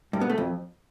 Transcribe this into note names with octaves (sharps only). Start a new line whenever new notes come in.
G2
B3
A3
F2